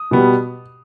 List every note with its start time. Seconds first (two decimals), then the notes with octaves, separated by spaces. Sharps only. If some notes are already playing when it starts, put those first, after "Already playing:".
Already playing: D#6
0.11 B2 G3 B3